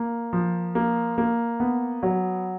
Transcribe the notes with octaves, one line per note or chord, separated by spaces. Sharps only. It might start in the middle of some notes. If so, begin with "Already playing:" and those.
Already playing: A#3
F3
A#3
A#3
B3
F#3